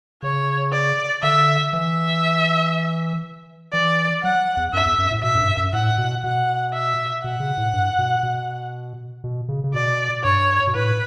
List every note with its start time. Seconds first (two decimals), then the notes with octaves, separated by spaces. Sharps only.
0.22 C#3 C#5
0.72 D5
1.23 D3 E5
1.73 E3 E5
3.73 E3 D5
4.23 F#3 F#5
4.57 E2
4.73 F#2 E5
4.86 E2
4.98 F#2
5.11 A2
5.23 B2 E5
5.34 F#2
5.40 G2
5.57 F#2
5.73 A2 F#5
5.98 B2
6.23 B2 F#5
6.73 E5
7.24 B2 F#5
7.40 C#3
7.57 A2
7.73 G2
7.98 B2
8.23 B2
9.24 B2
9.48 C#3
9.64 C#3
9.74 B2 D5
10.24 G2 C#5
10.67 B2
10.75 A2 B4